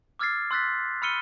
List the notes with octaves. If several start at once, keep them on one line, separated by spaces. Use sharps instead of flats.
D6 E6 F6 G#6 A6 C7
C6 E6 F#6 A6 B6
B5 E6 F6 C#7 D#7 G7